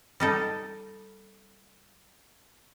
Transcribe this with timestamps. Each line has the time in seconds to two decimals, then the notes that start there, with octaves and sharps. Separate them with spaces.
0.20 G3 D#4 A4